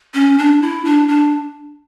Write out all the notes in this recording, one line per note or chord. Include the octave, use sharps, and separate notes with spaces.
C#4
D4
E4
D4
D4